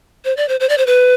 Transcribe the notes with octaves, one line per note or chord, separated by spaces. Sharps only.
C5
D5
C5
C5
D5
C5
B4